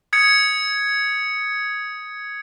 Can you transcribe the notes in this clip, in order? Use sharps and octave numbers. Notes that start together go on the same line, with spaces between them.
D#6 G#6 C#7